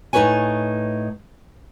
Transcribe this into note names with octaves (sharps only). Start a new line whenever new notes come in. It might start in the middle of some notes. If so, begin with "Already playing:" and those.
A2 D#4 G4 B4 C#5 G#5